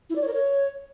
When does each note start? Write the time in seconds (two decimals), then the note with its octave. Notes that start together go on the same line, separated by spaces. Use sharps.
0.10 E4
0.16 D5
0.22 C#5
0.28 A#4
0.34 C#5